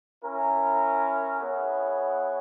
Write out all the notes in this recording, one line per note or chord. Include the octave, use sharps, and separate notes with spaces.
C#4 E4 A#4
B3 E4 G#4 C#5 F#5